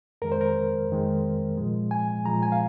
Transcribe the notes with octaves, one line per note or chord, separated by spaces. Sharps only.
F2 D#3 G#3 A#4
C5
A#4
F2 D#3 G#3
A#2 F3 G#3
G#5
A#2 F3 G#3 A#5
G#5
F5